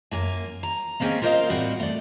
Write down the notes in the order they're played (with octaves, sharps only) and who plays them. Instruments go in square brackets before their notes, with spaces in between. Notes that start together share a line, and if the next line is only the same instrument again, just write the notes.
[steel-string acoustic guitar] F#2 A#3 G#5
A#5
G#3 A#3 C4 C#4 G#4
F4 A#4 C5 C#5 D#5 F5
A2 G3 C4 D#4 F#4 F#5
A3 D5